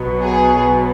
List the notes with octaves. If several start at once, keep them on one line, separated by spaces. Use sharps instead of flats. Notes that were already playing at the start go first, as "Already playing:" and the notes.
Already playing: B1 B2 F#3 B3
G#4